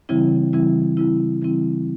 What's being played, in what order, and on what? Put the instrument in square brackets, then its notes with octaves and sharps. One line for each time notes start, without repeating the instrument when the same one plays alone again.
[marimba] C#3 E3 G3 C4 E4
C#3 E3 G3 C4 E4
C#3 E3 G3 C4 E4
C#3 E3 G3 C4 E4